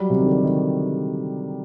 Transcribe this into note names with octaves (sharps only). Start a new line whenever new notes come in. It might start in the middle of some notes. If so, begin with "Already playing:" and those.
Already playing: F#3 G3
C3
D#3
D3
D#3